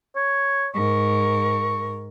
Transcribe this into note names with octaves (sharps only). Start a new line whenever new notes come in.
C#5
G#2 A#4 C#6